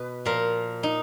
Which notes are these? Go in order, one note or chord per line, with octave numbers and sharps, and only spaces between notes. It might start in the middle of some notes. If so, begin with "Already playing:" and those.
Already playing: B2 B4
A#2 F3 A#4
D#4